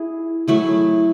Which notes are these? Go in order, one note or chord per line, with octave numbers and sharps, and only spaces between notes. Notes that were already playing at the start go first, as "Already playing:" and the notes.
Already playing: E4 G#4
F#3 A3 E4 G#4